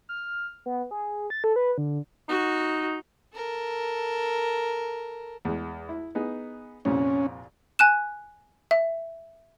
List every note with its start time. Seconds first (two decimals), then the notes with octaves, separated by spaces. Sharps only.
0.09 F6
0.66 B3
0.91 G#4
1.30 A6
1.44 A4
1.56 B4
1.78 D3
2.29 D#4 F#4
3.34 A4 A#4
5.45 E2 G#3
5.89 E4
6.15 B3 D#4 G#4
6.85 C2 F2 A#2 C#4
7.79 G#5 F#6 E7
8.71 E5